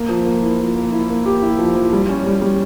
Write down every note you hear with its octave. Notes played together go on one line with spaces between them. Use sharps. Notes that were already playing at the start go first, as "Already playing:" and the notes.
Already playing: A#3
F3
A#3
E4
F3
A#3
E4
A#3
G4
E4
F3
F3
G3
C#4
G3
G3